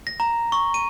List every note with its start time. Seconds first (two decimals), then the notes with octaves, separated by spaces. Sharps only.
0.07 A#6
0.20 A#5
0.52 C#6
0.74 D#7